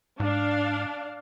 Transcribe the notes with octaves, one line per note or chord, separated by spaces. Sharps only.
G#2 D4 F5